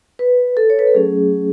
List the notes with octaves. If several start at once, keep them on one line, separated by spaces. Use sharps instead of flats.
B4
A4
C#5
B4
A4
F#3 A3 C#4 G#4